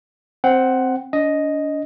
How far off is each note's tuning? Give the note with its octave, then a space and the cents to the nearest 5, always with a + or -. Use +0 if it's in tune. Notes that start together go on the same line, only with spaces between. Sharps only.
C4 +0 F#5 +15
D4 -40 D#5 +0